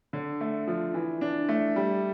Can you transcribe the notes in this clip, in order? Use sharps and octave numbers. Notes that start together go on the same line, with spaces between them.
D3
A3
F3
E3
D4
A3
G3